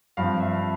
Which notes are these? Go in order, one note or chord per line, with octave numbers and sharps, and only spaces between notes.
G2 F3 C4 F5
E5